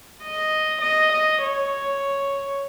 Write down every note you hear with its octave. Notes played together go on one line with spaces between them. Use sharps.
D#5
D#5
D#5
C#5